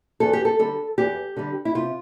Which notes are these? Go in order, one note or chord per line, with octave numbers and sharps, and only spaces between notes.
E2 A4
G4
A4
D3 G3 A4
E2 G4
D3 G3
E4
C3 F4